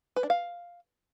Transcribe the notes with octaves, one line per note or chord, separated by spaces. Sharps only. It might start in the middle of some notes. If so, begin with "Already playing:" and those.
B4
D4
F5